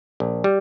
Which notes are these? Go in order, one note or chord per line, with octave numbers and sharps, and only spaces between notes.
A#1
G3